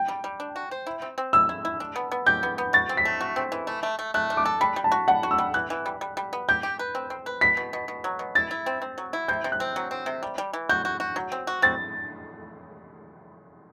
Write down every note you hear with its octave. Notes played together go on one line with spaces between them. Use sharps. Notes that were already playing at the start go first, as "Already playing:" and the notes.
Already playing: G5
G3
G3
D4
F#4
C5
E4
C4
C4
E4 E6
E4
E4
D4
B3
B3
G4 G6
B3
B3
F#4 A6
C4
B6
A3
F#4
C4
E3
A3
A3
A3
A3 F#6
D4
D6
A4
G3 B5
G3
A5
F#4
G3 F#5
F#4
E6
G3
E3 F#6
E3
G3
G3
G3
B3
G4 G6
G4
B4
C4
C4
B4
B2 B6
B2
B2
B2
F#3
B2
E4 A6
E4
C4
C4
F#3
E4
C3 G6
C3
F#6
C4
F#3
C4
C3
G3
G3
E3
F#4 G6
F#4
F#4
F#3
C4
F#4
C4 A6